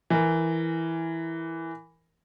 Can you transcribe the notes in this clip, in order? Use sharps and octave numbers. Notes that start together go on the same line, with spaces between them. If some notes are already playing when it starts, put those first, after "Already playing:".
E3 A#4